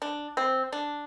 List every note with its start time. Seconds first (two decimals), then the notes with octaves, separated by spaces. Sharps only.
0.02 D4
0.37 C4
0.72 D4